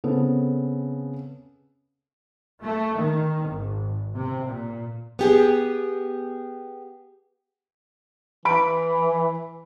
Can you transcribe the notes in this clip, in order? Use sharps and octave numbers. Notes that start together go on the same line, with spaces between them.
C#3 B3 C4 A4
A3
D#3
G#1
C3
A#2
B3 G4 G#4
E3 B5 D7